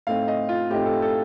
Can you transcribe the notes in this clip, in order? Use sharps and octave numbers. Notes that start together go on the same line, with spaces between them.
A2 A3 C4 D#4 F5
D#5
F4
A2 A3 C4 D#4 G4
A4
A4